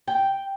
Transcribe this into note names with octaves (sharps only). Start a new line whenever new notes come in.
G5